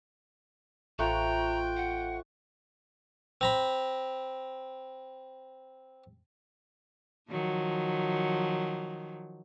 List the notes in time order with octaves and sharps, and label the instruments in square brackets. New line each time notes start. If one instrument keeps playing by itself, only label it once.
[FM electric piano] A1 C#6 F#6 [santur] A3 F4 C5 [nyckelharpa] G5 [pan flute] A#5
[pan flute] F#5
[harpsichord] C4 A#5 B5
[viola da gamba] D#3 F3 F#3